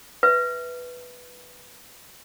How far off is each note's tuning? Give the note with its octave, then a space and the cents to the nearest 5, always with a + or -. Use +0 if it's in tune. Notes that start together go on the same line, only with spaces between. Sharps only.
B4 +0 E5 +0